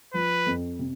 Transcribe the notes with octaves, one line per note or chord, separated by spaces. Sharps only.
F3 B4
F2
C3